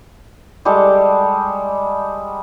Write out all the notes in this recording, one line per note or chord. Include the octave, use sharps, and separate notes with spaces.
G3 G#3 G4 A4